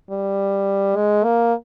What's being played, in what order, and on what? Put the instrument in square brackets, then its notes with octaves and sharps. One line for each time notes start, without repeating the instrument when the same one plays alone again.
[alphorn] G3
G#3
A#3